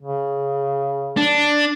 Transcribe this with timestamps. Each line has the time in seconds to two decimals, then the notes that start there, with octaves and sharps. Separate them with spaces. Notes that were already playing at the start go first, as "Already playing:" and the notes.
0.01 C#3
1.17 D4